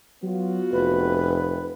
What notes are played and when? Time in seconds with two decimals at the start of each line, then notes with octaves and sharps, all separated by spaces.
0.23 F#3 B3 F4 F#4
0.72 F1 B4